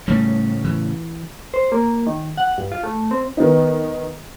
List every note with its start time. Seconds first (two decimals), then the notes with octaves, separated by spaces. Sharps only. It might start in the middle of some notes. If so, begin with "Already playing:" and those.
0.08 A2 C#3 G3 A3
0.64 E3
1.54 C5
1.72 A#3
2.07 D#3
2.37 F#5
2.58 G2
2.72 F4
2.84 A3
3.11 C4
3.37 D#3 B3 D#4